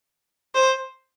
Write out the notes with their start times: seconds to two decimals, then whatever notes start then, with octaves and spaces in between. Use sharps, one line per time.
0.55 C5